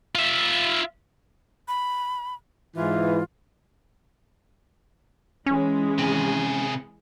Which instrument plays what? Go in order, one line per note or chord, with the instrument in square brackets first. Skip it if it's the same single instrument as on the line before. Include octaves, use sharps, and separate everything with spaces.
[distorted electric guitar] F4 E5
[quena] B5
[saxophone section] G#2 E3 [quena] F4
[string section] E3 G#3 [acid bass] C#4
[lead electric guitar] C3 G#4